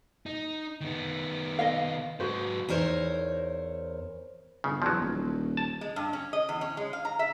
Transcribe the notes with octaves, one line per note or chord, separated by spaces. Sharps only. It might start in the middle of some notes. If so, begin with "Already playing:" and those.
D#4
D#3 B3
D#5 F5
G#2 F#4 B4 C5
E2 D#4 A#4 C5 C#5
G1 C#3
E2 F3 F#3
D#1
A5
G#3
G2
C#4
D#5
E2
C#4
G#3
F5
A#5
E5